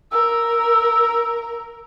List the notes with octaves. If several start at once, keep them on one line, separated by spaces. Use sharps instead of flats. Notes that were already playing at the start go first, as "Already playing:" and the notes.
A#4 E6